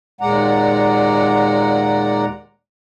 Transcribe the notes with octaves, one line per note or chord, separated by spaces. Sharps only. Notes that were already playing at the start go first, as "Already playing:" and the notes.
D#2 A#2 G#3 D5 F#5 A#5